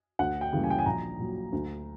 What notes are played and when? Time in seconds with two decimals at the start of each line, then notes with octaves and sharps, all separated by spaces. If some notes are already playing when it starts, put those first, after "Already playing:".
0.19 D2 F#5
0.41 G5
0.53 C#3 E3 G3 A#3
0.64 G#5
0.70 G5
0.79 G#5
0.86 A#1 A#5
1.19 A#2 F#3
1.52 D2